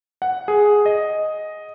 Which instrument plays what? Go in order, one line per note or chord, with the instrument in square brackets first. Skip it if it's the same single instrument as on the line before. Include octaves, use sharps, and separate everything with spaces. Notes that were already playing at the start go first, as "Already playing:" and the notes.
[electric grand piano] F#5
G#4
D#5